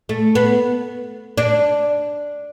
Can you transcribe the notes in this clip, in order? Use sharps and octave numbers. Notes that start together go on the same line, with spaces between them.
A3
B3
D4